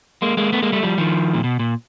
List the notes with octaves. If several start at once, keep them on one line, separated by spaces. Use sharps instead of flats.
G#3 A#3
G#3 A#3
A3 B3
G#3 A#3
G3 A3
F3 G3
D#3 F3
A#2
B2
A#2